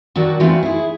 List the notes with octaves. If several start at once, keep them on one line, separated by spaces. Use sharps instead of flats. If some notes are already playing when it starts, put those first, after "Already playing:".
D#3 F#3 D4 F#4
E3 A3 C4 F4 F#4
E4 G#4